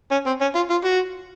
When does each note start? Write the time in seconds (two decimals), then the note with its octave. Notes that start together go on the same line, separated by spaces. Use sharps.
0.11 C#4
0.26 C4
0.41 C#4
0.55 F4
0.70 F4
0.84 F#4